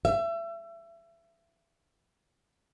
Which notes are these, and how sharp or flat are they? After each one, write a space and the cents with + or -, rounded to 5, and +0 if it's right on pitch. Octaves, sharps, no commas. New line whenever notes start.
E5 +30